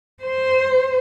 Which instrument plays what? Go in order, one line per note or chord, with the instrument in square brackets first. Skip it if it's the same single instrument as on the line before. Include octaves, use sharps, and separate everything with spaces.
[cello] C5